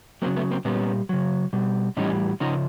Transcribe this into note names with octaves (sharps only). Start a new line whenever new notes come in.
C#3 F#3 A#3 C4
A3 B3
A#3 C4
A#2 G3 B3 C#4
C#3 F#3
B2 G3
A2 E3 G3 C#4 D#4
C#3 F3 C#4 D#4